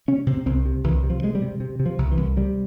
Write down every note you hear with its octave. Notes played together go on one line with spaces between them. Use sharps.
C3 C#4
C3 C4
C2 C4
C3
C2 E3
C3
F3
C3 G#3
G3
C3
C3
C3
F3
C2
E3
C2
C3 G3